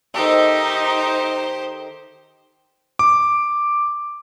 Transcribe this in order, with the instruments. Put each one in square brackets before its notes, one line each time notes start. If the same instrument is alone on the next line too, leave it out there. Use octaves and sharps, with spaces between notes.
[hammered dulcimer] D#3 A4 E5 [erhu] D#4 [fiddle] G4 C5
[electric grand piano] D6